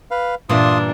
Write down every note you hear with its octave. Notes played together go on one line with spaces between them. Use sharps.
B4 F5
G2 A#2 E3 D4 F4 C6 D#6